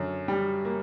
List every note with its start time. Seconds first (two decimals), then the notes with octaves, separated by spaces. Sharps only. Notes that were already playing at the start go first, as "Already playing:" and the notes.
Already playing: F#2 D3
0.28 G3
0.65 A#3